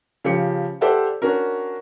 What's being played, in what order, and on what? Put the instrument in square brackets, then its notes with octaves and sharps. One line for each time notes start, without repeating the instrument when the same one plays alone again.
[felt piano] C#3 F3 G4 C#7
G4 A4 C5 D5 E5 F#5
C#4 D4 F#4 A#4